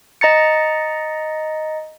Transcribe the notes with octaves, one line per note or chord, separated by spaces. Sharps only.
D#5 A#5 A6 C#7